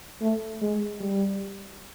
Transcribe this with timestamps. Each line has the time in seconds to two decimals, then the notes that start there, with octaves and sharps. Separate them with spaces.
0.21 A3
0.61 G#3
1.00 G3